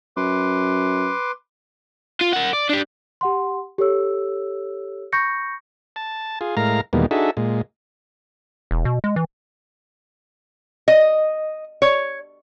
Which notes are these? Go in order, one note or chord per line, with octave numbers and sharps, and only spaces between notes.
F#2 B4 C6 D6
F4
A#4 F#5
D5
D4 G4
G4 F#5 C6
G4 A4 C#5 E6
B5 C#6 G6 A#6 C#7
A5
F4 G#4
A2 G#3 A#4 F5 A#5
E2 B2 D#3 G3 G#3 A#3
D4 D#4 F#4 G#4 A4 E5
A#2 G#3
E1
B2
G#3
E3
D#5
C#5